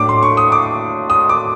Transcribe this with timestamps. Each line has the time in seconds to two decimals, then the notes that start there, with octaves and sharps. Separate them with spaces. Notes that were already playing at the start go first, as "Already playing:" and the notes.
Already playing: A2 F#3 A3 D4 D6
0.09 C6
0.23 C#6
0.37 D#6
0.52 D6
1.10 D#6
1.29 D6